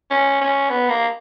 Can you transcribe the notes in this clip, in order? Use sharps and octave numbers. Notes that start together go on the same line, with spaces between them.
C#4
C#4
B3
A#3